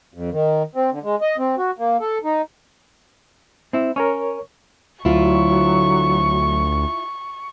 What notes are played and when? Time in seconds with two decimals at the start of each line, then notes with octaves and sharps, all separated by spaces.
0.14 F2
0.32 D#3
0.75 C4
0.92 D3
1.03 G#3
1.21 D#5
1.38 C4
1.58 F#4
1.79 A#3
2.01 A4
2.24 D#4
3.73 C4 E4
3.96 C#4 A#4 C#5 C#6
5.05 D2 F#3 E4 F4 C#6